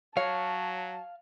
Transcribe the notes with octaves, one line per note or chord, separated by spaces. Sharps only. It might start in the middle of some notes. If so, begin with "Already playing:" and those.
F#3 C#5 F5 A5